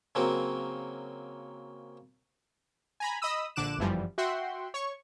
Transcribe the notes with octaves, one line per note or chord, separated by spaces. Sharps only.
C#3 F#3 A#3 C4 A#4
G#5 A#5 B5
D#5 B5 D#6 E6
A#1 D3 D6 F#6 E7
G1 F#2 E3 F3 G3
F#4 E5 F#5 G5 C6
C#5 C#6